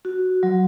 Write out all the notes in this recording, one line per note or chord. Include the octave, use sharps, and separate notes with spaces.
F#4
F#3